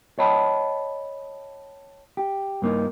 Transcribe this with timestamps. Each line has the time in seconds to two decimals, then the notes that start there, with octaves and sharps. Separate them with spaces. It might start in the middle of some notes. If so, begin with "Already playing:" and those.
0.19 C#5 D#5 G5 A5 B5
2.17 G4
2.62 G2 A#3 D#4